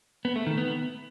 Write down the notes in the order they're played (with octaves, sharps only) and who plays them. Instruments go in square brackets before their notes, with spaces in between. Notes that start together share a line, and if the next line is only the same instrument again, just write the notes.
[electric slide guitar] B3
A3
D#3
B3